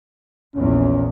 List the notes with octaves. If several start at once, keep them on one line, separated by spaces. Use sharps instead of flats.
A#1 E2 C#4